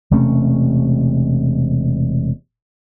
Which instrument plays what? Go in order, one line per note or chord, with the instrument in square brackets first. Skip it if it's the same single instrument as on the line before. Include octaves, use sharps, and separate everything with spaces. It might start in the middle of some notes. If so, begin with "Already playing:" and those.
[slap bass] E1 C3 A3 C#4